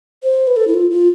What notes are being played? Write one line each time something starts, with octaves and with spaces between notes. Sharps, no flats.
C5
B4
A4
E4
F4
F4